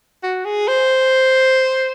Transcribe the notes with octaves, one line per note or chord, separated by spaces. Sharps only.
F#4
G#4
C5